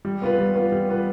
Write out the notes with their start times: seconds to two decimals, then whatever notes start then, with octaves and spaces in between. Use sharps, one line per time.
0.05 G3
0.22 B3 F4 B4
0.38 G3
0.56 B3 F4 B4
0.72 G3
0.88 B3 F4 B4